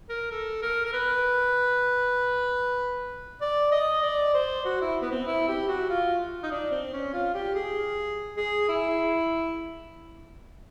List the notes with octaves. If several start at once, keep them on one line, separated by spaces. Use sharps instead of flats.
A#4
A4
A#4
A#4
B4
D5
D#5
D5
C5
F#4
E4
B3
C4
E4
G4
F#4
F4
D#4
D4
C4
C#4
F4
G4
G#4
G#4
E4